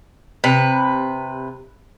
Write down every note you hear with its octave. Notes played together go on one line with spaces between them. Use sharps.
C3 B4